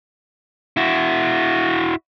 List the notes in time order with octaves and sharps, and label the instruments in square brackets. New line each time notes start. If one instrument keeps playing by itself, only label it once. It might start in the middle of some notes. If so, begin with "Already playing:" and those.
[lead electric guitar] E4 F#4